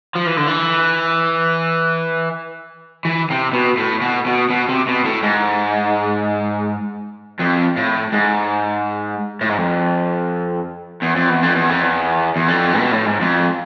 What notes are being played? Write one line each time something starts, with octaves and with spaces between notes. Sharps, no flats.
F3
E3
D3
E3
E3
C3
B2
A2
B2
B2
B2
C3
B2
A2
G#2
F2
A2
G#2
A2
G#2
F2
E2
F2
E2
F2
E2
F2
E2
E2
F2
B2
A2
G#2
F2